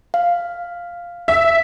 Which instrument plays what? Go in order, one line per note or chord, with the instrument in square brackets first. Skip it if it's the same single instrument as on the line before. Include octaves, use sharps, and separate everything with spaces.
[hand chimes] F5
[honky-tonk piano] E5